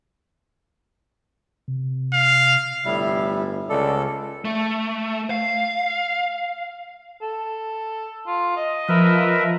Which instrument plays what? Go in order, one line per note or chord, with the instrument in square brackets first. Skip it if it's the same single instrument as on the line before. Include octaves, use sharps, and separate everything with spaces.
[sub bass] C3
[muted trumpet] F5
[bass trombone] G1 [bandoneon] A2 G3 [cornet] E5
[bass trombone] C#2 [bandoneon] A4 [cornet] D5
[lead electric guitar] A3
F5
[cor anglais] A4
F4
D#5
[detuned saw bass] F3 [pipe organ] A#4 B4 E5